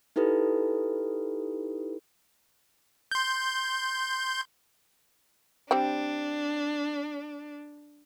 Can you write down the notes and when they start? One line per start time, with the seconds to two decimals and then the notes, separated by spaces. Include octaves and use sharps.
0.16 D#4 E4 G4 A4 B4
3.11 C6 G6
5.71 G3 C4 D4 G5